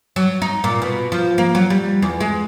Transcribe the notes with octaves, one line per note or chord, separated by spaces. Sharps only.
F#3
D#4
A#2
B2
F3
A#3
F#3
G3
E2
G#3